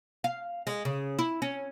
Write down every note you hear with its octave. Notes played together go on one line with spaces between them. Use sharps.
F5
G#3
C#3
E4
C#4